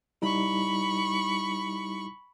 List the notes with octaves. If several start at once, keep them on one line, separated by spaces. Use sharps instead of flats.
G3 D#4 E4 B5 C#6